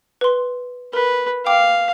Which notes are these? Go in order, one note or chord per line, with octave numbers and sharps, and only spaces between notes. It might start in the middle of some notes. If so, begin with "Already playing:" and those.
B4 C6
A#4 B4
F5 G5 D6